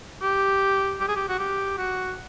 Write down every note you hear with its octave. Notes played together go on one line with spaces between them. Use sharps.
G4
G4
G#4
G4
F#4
G4
F#4